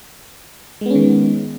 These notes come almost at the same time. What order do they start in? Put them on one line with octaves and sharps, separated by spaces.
G#3 B3 C#4 D#3